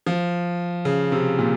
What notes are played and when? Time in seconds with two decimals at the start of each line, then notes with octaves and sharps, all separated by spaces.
0.06 F3
0.85 C#3
1.12 C3
1.38 A#2